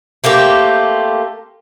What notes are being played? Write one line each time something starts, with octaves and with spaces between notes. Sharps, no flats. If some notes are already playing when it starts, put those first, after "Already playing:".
A3 A#3 C4 G4